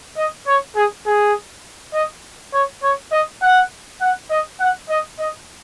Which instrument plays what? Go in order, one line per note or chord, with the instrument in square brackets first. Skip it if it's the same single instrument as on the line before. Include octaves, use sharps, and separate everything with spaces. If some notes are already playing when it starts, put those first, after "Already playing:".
[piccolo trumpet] D#5
C#5
G#4
G#4
D#5
C#5
C#5
D#5
F#5
F#5
D#5
F#5
D#5
D#5